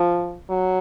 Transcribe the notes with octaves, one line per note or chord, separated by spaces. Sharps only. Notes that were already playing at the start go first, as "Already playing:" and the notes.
Already playing: F3
F#3